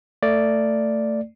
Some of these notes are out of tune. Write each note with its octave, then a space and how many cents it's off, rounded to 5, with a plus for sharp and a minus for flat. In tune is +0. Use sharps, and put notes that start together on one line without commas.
A3 +20 D5 +0